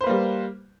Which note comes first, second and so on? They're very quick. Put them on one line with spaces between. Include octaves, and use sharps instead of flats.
C5 B4 A#3 G3